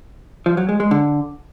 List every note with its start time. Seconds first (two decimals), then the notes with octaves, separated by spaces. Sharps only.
0.46 F3
0.57 F#3
0.69 G#3
0.80 G#3
0.91 D3